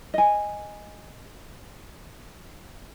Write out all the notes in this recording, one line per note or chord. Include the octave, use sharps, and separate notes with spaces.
D#5 G#5